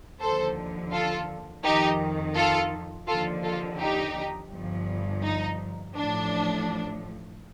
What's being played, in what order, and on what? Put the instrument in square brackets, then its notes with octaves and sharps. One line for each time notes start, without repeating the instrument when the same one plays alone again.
[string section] D#2 D3 F3 A4 C5
F4 A4
F2 D#3 D#4 G4
F4 A4
D#2 D3 F3 F4 A4
F4 A4
D#4 G4
G1 G2 F3
D#4
A1 A2 F3 D4